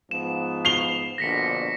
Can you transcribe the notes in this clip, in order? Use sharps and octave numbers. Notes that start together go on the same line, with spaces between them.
G#2 F3 B3 E7
C7 F7 G7
A#1 B2 D3 A#6 B6 C#7